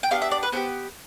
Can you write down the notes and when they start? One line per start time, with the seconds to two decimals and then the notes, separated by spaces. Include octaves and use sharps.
0.03 G5
0.11 B3 D4 G4 F5
0.22 E5
0.31 D5
0.43 B4
0.52 B3 D4 G4 C5